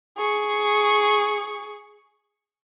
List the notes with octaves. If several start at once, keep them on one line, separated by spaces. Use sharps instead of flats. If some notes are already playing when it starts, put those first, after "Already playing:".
G#4 C#6